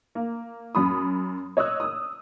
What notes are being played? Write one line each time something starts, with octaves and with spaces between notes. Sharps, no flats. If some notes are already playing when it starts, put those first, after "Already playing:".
A#3
F#2 B5 D#6
C#5 D#5 D#6 E6 F#6
D#6 E6